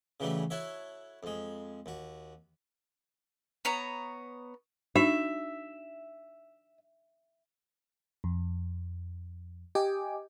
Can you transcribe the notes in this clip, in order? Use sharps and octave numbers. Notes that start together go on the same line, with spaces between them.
C#3 E3 F#3 G3 A3
E4 F#4 A4 C#5 E5
F2 G#3
D#2 F#4
B3 C#5 A#5
D4 D#4 F#4 E5
F2
G4 D#5 G5 G#5 D6